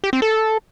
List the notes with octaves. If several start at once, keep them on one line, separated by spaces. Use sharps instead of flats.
G4
C4
A4